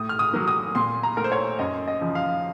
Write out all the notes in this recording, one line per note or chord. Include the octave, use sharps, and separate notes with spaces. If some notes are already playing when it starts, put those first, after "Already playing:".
Already playing: A2 D#6
F6
D#6
F#3 A#3
D#6
A#2 C6
A#5
A3 A#4
C5
C#5
F#2 D#5
D#5
C#3 F3
F5